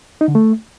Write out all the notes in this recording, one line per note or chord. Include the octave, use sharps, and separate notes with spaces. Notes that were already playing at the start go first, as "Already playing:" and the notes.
D#4
D3
A3